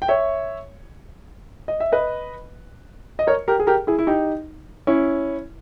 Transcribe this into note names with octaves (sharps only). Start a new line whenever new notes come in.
G5
C#5 E5
D#5
E5
B4 D#5
D#5
A#4 C#5
G4 A#4
G#4
G4 A#4
E4 G#4
E4
D#4 G4
C#4 E4